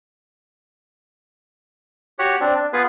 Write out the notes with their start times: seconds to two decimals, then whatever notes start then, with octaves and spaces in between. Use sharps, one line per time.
2.19 F#4 G4 C#5 F#5
2.41 C4 D4
2.56 D4
2.73 B3 F4 G#4 B4